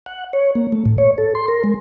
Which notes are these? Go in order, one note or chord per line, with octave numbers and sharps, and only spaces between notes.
F#5
C#5
A#3
A3
A2
C#5
A4
C6
A#4
G#3